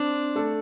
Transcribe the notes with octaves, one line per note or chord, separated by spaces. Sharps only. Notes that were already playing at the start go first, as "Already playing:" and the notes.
Already playing: C4 D4 C5
A3 A4